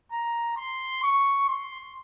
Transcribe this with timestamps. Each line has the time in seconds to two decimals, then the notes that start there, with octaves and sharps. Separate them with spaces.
0.12 A#5
0.57 C6
1.03 C#6
1.48 C6